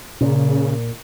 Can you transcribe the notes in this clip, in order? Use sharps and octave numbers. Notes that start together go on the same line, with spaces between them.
A#2 C#3